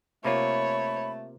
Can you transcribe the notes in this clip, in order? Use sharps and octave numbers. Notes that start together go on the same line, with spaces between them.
C3 A3 A#3 F4 C#5 B5